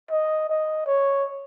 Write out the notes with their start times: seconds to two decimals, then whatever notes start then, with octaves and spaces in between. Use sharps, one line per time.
0.11 D#5
0.50 D#5
0.87 C#5